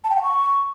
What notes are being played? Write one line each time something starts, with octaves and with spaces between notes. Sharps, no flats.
A5
G5
F#5
C#6